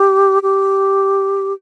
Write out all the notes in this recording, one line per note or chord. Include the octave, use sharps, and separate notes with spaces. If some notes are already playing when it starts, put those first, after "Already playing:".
Already playing: G4
G4